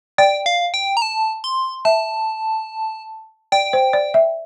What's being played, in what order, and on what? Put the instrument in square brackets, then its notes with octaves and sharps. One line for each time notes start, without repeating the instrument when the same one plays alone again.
[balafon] D5 [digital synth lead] G5
[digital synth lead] F5
G5
A#5
A5
C6
[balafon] E5 [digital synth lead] A5
[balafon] D5 [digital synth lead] G5
[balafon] C5
D5
E5